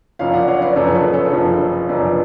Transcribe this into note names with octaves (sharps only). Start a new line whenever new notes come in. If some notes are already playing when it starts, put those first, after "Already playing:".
F#1 F#2 F3 C#5 F5
D5 F#5
C#5 F5
B4 D5
F#1 F#2 F3 A4 C#5
G#4 B4
A4 C#5
F#1 F#2 F3
F#1 F#2 F3 B4 D5